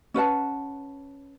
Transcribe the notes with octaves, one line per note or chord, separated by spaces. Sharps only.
C#4 B4 F#5 A5